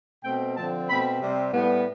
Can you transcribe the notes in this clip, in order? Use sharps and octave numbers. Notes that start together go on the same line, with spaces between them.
B2 A3 C4 G5
D3 F3 C4 A5
B2 A3 C4 B5
C3 G3 C4
A2 G3 B3